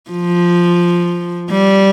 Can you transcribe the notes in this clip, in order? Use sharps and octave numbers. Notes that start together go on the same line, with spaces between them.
F3
G3